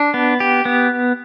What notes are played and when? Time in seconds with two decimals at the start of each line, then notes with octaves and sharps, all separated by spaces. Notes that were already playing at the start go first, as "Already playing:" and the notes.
Already playing: D4
0.14 B3
0.40 G4
0.65 B3